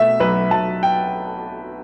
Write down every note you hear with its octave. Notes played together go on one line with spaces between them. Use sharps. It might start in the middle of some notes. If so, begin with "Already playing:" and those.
Already playing: B2 A3 E5
B1 B4
B1 A5
G5